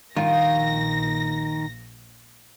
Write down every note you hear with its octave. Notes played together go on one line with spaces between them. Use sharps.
A#1 D#3 F4 A#6